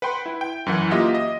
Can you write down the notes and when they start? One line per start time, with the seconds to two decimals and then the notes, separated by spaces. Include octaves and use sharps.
0.02 B4 F#5 G5 C6
0.26 E4
0.41 G5
0.66 F#2 E3 F#5
0.91 A#3 F4 G4 D#5 E5
1.14 D#5